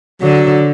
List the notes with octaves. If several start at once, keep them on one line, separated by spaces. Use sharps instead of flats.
D3 F#3